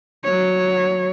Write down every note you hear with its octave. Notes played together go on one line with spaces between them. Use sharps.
F#3 C#5